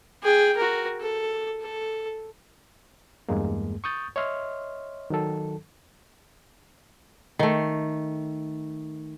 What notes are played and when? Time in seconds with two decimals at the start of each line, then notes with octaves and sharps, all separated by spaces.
0.23 G#4 G5
0.57 F#4 A#4
1.01 A4
1.61 A4
3.29 E2 G2 G#3 A#3
3.84 C#6 D#6 G6 A6
4.16 C#5 D#5 E5 C6 F6
5.10 D#3 F#3 A4
7.39 D#3 A3